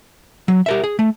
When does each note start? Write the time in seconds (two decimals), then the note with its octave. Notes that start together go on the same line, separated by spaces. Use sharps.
0.48 F#3
0.66 G4 A#4 E5
0.84 G#4
0.99 A3